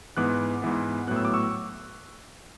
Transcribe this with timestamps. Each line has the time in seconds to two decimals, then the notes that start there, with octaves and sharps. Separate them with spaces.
0.17 G#2 E3 B3 D6 F#6
0.62 G#2 E3 B3
1.07 A2 F#3 B3 F#6
1.16 E6
1.25 D6
1.34 C#6 E6